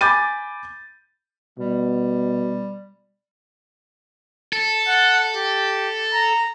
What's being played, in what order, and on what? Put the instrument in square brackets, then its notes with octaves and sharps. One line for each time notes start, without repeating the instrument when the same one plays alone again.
[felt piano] G#5 B5 D6 G6 A6 D#7
[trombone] B2 [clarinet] G3
[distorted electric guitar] A4
[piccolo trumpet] F#5
G4
A#5